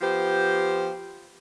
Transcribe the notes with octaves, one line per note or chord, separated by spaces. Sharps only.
F3 B3 G4 C5